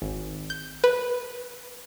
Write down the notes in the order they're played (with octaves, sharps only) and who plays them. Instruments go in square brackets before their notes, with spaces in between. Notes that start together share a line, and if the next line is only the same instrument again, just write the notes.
[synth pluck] G#1
G6
B4